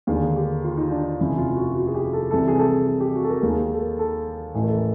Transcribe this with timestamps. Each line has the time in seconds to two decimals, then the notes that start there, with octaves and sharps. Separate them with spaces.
0.07 D#2 D3 G#4
0.36 G4
0.64 F4
0.77 D#4
0.91 D4
1.20 F1 F2 C#3 E4
1.38 F4
1.56 F#4
1.75 F#4
1.87 G#4
1.94 G4
2.13 A4
2.31 C2 C3 E3 A4
2.48 G#4
2.59 A4
2.87 G#4
3.00 G4
3.15 F#4
3.24 A4
3.29 A#4
3.43 D#2 D#3 G#4
3.74 A4
3.81 A#4
3.99 A4
4.54 A1 A2 E3
4.63 A#4
4.68 A4